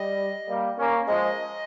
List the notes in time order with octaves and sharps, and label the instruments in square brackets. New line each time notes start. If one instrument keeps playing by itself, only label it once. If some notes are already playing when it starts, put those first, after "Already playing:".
Already playing: [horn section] G3 [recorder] D#5
[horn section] G3 A#3
A#3 C#4
[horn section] F3 G#3 [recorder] D#5